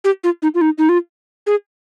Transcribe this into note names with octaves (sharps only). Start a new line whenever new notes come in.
G4
F4
D#4
F4
D#4
D#4
F4
G#4